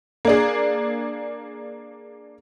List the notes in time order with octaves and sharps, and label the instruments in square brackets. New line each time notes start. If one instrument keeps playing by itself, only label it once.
[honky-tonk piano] A#3 D4 G#4